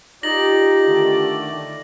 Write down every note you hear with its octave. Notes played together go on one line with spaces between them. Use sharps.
D#4 F4 G4 D5 A#6 F#7
D3 D#3 A3